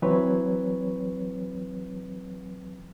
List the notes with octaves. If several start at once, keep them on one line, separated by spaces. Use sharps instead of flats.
E3 F#3 C4 B4 C#5